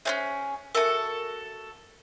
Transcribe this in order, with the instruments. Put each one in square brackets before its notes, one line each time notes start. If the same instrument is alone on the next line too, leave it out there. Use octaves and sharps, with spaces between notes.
[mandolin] C#4 F#4 G#4 [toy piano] C5 C#5 E5
[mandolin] F#4 A4 [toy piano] A#4 E5 A5